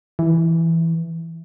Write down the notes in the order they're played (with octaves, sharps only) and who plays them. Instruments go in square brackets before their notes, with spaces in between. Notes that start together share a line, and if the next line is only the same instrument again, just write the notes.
[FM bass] E3